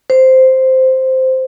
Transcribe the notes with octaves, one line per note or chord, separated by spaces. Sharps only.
C5